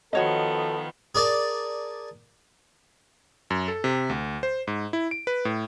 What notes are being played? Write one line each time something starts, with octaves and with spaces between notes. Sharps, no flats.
D#3 F3 B3 F#4 A4 C#5 D#5
G#4 A#4 D5 A5
F#2
A4
C3
D2
C5
G#2
E4
D7
B4
A2